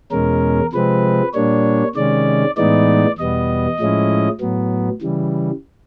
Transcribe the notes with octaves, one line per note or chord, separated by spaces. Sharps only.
E2 B2 G#3 C#4 A#4
C3 F3 G#3 C4 B4
A#2 G3 A#3 D4 C#5
C3 D#3 G#3 C#4 D5
A2 E3 G#3 B3 D#4 D5
E2 B2 G3 B3 D#5
A2 F3 G#3 C#4 E4
A2 F#3 B3
C#3 E3 G3